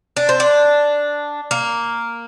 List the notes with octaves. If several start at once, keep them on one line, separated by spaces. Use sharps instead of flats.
D4
C4
D4
A#3